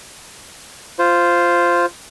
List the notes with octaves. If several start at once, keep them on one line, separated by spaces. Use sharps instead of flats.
F4 C5